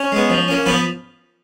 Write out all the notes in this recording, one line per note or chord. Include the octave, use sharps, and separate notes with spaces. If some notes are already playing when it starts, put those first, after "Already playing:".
Already playing: C#4 C#5
G#3 B3
F3
A#3 C#4
F3 B3 B4